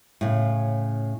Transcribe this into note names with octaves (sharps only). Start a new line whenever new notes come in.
A2 C#3